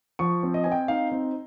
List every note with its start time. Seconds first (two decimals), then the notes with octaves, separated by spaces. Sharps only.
0.19 F3 C#6
0.43 C4
0.54 D#5
0.64 C4 G#5
0.72 G5
0.88 D#4 F5
1.12 C4